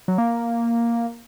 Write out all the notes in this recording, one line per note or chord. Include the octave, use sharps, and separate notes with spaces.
F#3
A#3